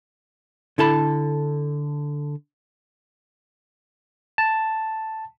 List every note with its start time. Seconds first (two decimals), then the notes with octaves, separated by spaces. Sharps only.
0.78 D3 E4 A4 A5 B5
4.38 A5